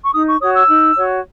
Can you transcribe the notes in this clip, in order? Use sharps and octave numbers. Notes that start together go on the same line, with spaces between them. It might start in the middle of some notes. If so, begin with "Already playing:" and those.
C#6
D#4 D#6
C#6
F#4 C#5 D#6
E6
D#4
F#4 C#5